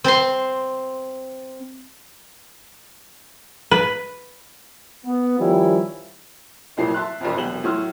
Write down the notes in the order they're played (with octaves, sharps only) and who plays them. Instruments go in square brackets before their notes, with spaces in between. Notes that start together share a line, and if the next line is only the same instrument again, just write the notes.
[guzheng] C4 C6
[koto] B4
[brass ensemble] B3
D#3 F3 G3 C#4 E4
[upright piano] C2 F2 A#2 E3 F#3 C7
E5 A5 C6 F#6
E1 B1 F2
E1 C2 F#3 B3 F#7
A2 F#3 E4 C6 E6 F6